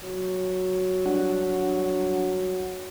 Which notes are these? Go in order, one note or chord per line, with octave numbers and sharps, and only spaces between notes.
F#3
G3 D4 F#5